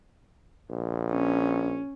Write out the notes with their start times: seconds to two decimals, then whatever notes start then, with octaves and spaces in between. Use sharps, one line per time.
0.69 A#1
1.12 C#4